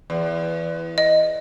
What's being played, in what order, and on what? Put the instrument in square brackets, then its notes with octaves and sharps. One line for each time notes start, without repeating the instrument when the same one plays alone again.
[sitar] E2
[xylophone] D#5